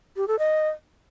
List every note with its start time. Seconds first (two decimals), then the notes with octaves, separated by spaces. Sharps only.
0.17 G4
0.28 A4
0.39 D#5